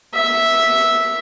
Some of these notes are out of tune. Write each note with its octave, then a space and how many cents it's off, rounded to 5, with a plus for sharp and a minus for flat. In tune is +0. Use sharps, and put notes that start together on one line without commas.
E5 -5